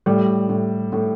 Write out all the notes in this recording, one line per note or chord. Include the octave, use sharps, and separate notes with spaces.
A2 G3
A2
A2